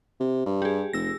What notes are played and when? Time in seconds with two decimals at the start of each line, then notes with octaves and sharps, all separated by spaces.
0.20 C3
0.46 G2
0.62 G4 G#4
0.93 F1 E6 A#6